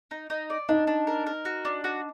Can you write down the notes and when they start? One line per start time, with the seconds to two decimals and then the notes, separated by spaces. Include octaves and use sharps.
0.11 D#4
0.30 D#4
0.50 D5
0.69 D4 D#4
0.87 D4
1.07 A#4
1.27 A#4
1.45 F#4
1.65 D4
1.84 F#4